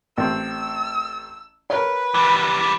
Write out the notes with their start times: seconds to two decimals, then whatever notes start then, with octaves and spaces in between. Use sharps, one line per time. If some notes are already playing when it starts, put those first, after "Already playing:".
0.18 A1 C4 E6
1.70 A#4 B4 C#5
2.14 E3 G3